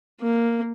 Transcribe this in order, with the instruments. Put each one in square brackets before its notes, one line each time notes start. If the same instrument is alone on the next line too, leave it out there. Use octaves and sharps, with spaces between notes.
[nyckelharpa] A#3